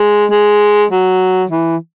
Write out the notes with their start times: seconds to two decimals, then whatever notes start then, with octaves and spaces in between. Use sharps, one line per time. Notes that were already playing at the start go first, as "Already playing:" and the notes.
Already playing: G#3
0.31 G#3
0.91 F#3
1.50 E3